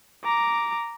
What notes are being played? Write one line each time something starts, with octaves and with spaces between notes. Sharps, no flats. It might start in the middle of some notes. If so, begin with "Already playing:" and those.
A#5 D6